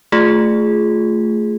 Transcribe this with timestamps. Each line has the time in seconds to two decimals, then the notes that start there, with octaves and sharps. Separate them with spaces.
0.12 A3 F4 G#4